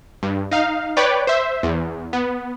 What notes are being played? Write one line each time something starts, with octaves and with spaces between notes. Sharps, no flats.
G2
D#4 F5
B4 C#5 D5 G5 D6
C5 E5
E2
B3